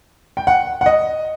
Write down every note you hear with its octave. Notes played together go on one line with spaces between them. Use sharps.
G5
F#5
F#5
D#5